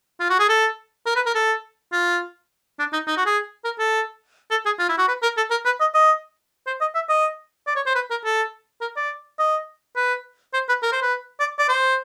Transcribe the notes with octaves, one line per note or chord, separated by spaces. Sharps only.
F4
F#4
G#4
A4
A#4
B4
A#4
A4
F4
D4
D#4
D#4
F#4
G#4
A#4
A4
A4
G#4
F4
E4
F#4
B4
A#4
A4
A#4
B4
D#5
D#5
C5
D#5
E5
D#5
D5
C#5
C5
B4
A#4
A4
A#4
D5
D#5
B4
C5
B4
A#4
C5
B4
D5
D5
C5